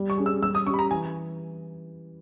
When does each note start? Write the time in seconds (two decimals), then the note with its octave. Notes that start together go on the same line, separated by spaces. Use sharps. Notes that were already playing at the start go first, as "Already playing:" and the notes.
Already playing: G3
0.10 C#6
0.18 C#4 G#4
0.26 E6
0.42 G3 E6
0.55 D#6
0.66 C#4 C#6
0.70 G4 B5
0.79 A#5
0.91 E3 G#5